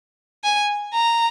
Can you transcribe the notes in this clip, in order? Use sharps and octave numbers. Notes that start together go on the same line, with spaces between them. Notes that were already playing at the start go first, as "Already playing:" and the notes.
G#5
A#5